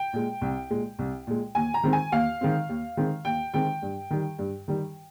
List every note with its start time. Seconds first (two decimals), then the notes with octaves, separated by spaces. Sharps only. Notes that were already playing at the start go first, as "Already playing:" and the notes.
Already playing: G5
0.13 A#2 G#3
0.41 C2
0.70 A#2 G#3
0.99 C2
1.27 A#2 G#3
1.55 D#2 G#5
1.74 A#5
1.83 D#3 G#3 C4
1.93 G#5
2.12 D#2 F5
2.41 D#3 G#3 C4
2.69 D#2
2.97 D#3 G#3 C4
3.25 D#2 G5
3.54 D#3 G#3 C4 G5
3.82 G2
4.10 D#3 G3
4.39 G2
4.68 D#3 G3